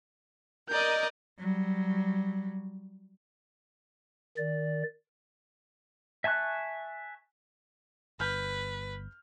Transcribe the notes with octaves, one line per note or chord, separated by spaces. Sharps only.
A#4 D5 D#5 G6
F#3 G3
D#3 D5
E5 G#5 A5 C#6 F#6
G1 B4 F6 G6